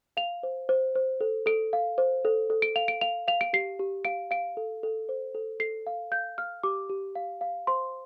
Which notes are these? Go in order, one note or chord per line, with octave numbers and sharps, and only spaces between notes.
F5 F7
C5
C5
C5
A4
A4 D7
F5
C5
A4
A4
D7
F5 F7
D7
F5 F7
F5 F7
D7
G4 C7
G4
F5 D7
F5 D7
A4
A4
C5
A4
A4 C7
F5
F5 G6
F5 F6
G4 D6
G4
F5
F5
C5 C6